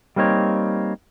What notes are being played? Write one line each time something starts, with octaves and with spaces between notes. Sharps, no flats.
G3 A#3 C4 D#4 C#5